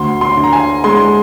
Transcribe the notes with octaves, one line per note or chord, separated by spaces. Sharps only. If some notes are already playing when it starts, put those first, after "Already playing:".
Already playing: D2 C6
C6
D3
A#5
G#5
G#3 C6